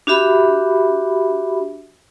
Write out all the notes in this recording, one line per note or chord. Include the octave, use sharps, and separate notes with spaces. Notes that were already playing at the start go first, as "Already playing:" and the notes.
D4 F#4 G4 E5 B5